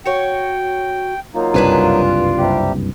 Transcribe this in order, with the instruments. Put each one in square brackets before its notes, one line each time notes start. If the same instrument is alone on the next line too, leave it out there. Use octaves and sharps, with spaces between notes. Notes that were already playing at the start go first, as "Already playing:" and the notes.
[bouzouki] F#4 C#5 [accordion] G5
[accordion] F#3 A#3 D#4 [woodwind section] F4
[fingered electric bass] F#1 C2 G2 [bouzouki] D4 B4 G#5
[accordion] C3 G3 G4